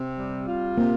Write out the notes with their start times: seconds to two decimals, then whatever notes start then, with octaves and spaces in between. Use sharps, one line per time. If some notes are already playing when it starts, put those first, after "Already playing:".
Already playing: C3 C4
0.17 G3
0.47 F4
0.77 C3 A#3